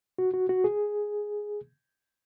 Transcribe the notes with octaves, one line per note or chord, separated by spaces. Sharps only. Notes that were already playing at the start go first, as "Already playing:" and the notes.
F#4
F#4
F#4
G#4